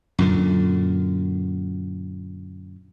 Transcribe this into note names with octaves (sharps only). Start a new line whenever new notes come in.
F#2 A#2 D3